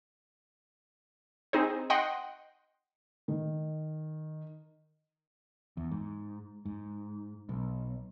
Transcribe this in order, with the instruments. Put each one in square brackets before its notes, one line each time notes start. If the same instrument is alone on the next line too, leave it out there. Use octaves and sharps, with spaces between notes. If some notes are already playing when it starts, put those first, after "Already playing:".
[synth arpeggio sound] C4 D#4 G#4 C5
D#5 F#5 G5 C6
[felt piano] D#3
[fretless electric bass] E2
G#2
G#2
B1